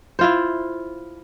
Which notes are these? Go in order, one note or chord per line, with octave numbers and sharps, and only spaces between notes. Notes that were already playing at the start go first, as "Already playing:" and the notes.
E4 F4 C5